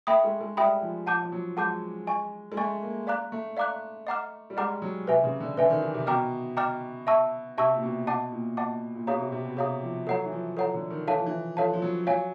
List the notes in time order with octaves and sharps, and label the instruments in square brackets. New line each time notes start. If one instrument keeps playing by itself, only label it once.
[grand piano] A3 [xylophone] E5 G5 B5 D#6
[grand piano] G#3
G#3
[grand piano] G3 [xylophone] E5 G5 B5 D#6
[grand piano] F3
[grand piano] F3 [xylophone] F#5 A5 D6 G6
[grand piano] F3
F#3
[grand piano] G#3 [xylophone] F#5 A5 D6 G6
[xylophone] D#5 G#5 C#6
[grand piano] G#3
[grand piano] A3 [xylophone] D#5 G#5 C#6
[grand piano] A#3
[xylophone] D5 F5 A#5 D6 F#6
[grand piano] A3
[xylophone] D5 F5 A#5 D6 F#6
D#5 F#5 A#5 D6 F6
[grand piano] G3
[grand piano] G#3 [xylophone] D#5 F#5 A#5 D6 F6
[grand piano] F#3
[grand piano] C3 [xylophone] B4 E5 G#5
[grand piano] C#3
D3
[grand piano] D3 [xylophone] B4 E5 G#5
[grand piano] D#3
E3
C3
[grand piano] B2 [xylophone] D#5 G5 A#5 D6 F6
[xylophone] D#5 G5 A#5 D6 F6
E5 A5 C#6 E6
[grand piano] C3 [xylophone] E5 A5 C#6 E6
[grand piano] A#2
B2
[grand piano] B2 [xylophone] D#5 F#5 A5 D6
[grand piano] A#2
[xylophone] D#5 F#5 A5 D6
[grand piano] A#2
[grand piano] B2 [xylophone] G#4 C#5 F5 A#5 D#6
[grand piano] C3
C3
B2
[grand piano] C3 [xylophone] G#4 C#5 F5 A#5 D#6
[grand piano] F3
[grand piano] F#3 [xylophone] A4 C#5 F#5 A#5
[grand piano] E3
F3
[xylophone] A4 C#5 F#5 A#5
[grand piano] D3
D#3
[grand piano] E3 [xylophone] A4 C#5 F5 A5
[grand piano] F3
E3
[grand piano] F3 [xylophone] A4 C#5 F5 A5
[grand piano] F3
F#3
[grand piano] F#3 [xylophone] C#5 F5 G#5